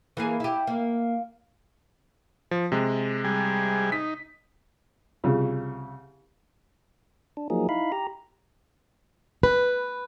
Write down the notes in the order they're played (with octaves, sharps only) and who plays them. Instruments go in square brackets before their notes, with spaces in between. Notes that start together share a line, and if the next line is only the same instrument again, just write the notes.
[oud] E3 A#3 G#4
E4 G4
A#3
[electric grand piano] F3
C3 G#3
[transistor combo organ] G3 G#4
[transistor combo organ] D#4 [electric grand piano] B6
[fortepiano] C2 C#3 F3
[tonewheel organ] D4
F3 F#3 A#3 D#4 G#4
D#4 E4 F5 B5
G4 A#5
[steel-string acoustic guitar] B4